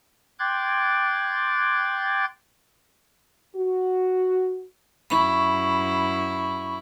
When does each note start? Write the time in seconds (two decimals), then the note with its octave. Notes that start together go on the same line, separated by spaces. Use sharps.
0.39 G5 C6 D6 F#6 G#6 A6
3.56 F#4
5.10 F#2 E4 B5 C#6